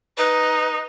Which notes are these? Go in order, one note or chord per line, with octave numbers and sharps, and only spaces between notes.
D#4 B4